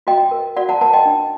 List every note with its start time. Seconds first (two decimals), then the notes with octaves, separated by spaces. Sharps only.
0.07 F#4 D#5 G5
0.31 A#4
0.57 F#4 D5 F#5
0.69 F#5 A5
0.81 A#4 F#5 A5
0.93 D#5 G5
1.05 D4